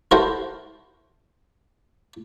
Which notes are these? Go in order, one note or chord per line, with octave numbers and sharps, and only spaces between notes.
E4 F#4 A4 A#4 C5